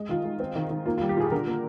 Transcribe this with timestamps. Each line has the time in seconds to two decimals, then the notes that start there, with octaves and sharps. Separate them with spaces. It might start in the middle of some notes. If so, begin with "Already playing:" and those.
Already playing: G#3
0.09 D#3 F4
0.24 G#3
0.40 C4
0.55 D#3
0.70 D#3
0.86 A#3 F4
0.98 F4
1.01 G3
1.09 G4
1.17 A#2 G#4
1.27 G#4
1.31 D3 A#4
1.47 A#3